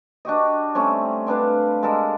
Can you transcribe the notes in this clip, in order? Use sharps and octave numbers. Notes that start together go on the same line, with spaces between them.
D4 F#4 G4 D#5
G3 A3 C4 C#4
C4 D4 B4 F5
G#3 G4 A4 A#4